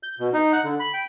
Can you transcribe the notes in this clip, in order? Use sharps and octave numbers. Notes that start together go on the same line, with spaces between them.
G6
B2
D#4
F#5
D3
B5
G5